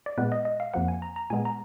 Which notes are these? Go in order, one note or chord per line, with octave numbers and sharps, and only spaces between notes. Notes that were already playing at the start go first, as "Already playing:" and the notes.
D5
A#2 G#3 B3 B4
D#5
D#5
F5
F2 F3 A#3 F#5
G#5
A#5
A#5
A#2 G#3 B3 G#5
A#5